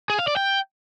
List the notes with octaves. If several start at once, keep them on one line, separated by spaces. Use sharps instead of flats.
G#4
F5
D5
G5